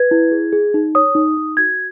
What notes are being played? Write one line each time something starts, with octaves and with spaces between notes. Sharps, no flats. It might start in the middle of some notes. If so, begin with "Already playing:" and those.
Already playing: B4 G#6
E4
G#4
G#4
D#4
C#5 D#6
D#4
D#4
F#4 G#6